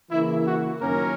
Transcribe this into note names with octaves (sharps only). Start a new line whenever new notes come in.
C#3 E3 A#3 E4
F#4
F#2 D#3 A#3 C#4 A#4